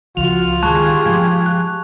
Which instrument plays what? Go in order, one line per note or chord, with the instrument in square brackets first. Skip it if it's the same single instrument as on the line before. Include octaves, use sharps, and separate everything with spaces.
[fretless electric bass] C#2 F3 [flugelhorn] F4 [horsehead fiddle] F#4 [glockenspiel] F7
[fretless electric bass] D#3 G#3 [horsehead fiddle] G4 G#4 [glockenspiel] A5 C#6 F#6
[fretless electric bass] F3 G#3
[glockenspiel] F#6